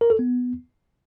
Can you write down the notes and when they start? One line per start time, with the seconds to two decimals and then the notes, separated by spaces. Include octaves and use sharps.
0.01 A#4
0.10 A4
0.19 B3